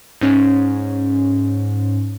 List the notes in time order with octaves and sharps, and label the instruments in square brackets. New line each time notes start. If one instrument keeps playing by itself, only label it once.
[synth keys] G#2 C#4